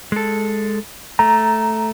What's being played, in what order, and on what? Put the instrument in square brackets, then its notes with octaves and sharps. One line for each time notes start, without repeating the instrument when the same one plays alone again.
[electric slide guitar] G#3 A4
[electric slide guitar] A3 [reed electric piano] A#5